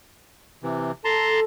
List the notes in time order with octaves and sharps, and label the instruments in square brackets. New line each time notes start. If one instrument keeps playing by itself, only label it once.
[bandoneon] C3 E3
[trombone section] A4 [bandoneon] A5 A#5 C6